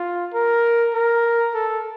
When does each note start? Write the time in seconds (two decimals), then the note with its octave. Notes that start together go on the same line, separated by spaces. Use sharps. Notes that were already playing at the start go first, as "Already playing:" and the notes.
Already playing: F4
0.33 A#4
0.94 A#4
1.54 A4